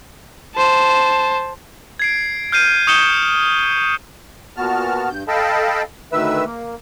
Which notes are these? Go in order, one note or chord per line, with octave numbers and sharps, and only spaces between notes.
C5 A5
G#6 C7 D7
F6 G6 C7 D#7
C#6 D#6 G6 C#7 E7 G7
A#2 B3 F#4 A5 F6
G2 G6
A4 D#5 F5 G5 A5 B5
D2 D#3 B4 E5 E6
A#3